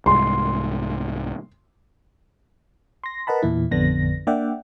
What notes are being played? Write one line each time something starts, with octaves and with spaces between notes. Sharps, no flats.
C2 G#2 C6
C6 A#6
A#4 B4 D#5 F#5 A5 B5
E2 A#2 E3 E4
A1 F2 D3 B3 D4 A#6
A#3 D4 D5 E5 F#5 G5